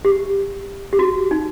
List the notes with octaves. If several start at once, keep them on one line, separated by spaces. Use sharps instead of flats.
G4
G4
F#4
D#4